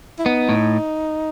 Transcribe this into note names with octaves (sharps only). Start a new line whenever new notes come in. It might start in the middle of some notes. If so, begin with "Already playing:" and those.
E4
B3 D#4
A2